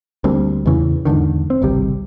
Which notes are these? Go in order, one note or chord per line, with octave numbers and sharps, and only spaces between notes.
D2 G3 A#3 C4
E2 A2 C#3 E3
E2 G#2 D3 D#3
C4
G#1 C#2 C3 G3